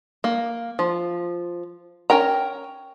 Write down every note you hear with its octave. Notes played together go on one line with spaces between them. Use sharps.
A#3
F3
C#4 A#4 G5 A#5